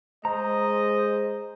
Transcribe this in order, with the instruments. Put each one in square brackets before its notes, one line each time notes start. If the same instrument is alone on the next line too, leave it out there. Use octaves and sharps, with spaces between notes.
[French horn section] G#3 [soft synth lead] C5 [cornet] D#5 [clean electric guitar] A#5